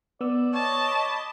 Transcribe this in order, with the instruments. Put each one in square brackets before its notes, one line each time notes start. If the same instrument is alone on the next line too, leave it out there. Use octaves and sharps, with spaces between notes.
[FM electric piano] B3 E6 [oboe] D5
[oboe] C#5 [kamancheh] D#5 A5
[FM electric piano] B5 D6